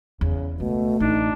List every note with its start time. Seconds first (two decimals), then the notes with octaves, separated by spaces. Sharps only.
0.21 E2 C#3
0.60 C#2 B2 A3
1.00 A1 D4 D#4